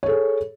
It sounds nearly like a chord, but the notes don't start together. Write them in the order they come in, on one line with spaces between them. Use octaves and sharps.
C#5 A4 G#4